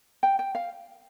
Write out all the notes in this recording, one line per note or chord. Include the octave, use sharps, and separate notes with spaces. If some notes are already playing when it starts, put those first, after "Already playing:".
G5
G5
F5